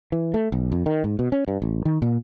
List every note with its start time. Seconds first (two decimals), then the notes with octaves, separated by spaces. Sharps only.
0.12 E3
0.34 A3
0.52 B1
0.72 F2
0.86 D#3
1.04 G#2
1.19 B2
1.32 C#4
1.48 G2
1.62 A1
1.85 D#3
2.02 A#2